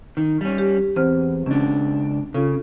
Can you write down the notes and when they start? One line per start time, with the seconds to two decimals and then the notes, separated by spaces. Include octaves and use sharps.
0.17 D#3
0.41 G3 C#4
0.58 G4
0.96 E2 C4 C5 F6
1.46 C#2 C#4 D4
2.34 C#3 F4 A4